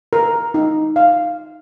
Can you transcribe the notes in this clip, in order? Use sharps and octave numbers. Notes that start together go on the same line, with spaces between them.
A#4
D#4
F5